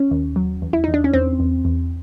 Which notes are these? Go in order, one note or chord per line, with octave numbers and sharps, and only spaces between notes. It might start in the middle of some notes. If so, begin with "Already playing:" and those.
Already playing: C#4
D#2
F#3
E2
E4
E2 D#4
D4
C#4
E2 C4
E2
E2